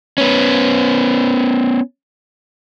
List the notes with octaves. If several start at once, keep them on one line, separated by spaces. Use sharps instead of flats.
B3 C#4